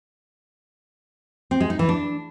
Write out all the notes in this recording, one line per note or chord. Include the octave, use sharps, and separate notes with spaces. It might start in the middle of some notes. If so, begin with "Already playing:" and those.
C4
G#3
D#4
E3
D4